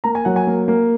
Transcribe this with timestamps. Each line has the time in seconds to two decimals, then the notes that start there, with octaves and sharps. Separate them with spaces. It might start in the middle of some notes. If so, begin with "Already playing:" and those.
0.04 A#3 A#5
0.15 G#5
0.25 F#3 F#5
0.36 G#5
0.47 A#3
0.68 A#3